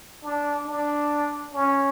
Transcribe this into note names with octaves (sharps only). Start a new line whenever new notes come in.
D4
D4
C#4